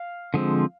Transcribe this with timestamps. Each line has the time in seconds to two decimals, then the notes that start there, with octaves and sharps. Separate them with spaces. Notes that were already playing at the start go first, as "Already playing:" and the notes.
Already playing: F5
0.34 D3 F3 G#3 C4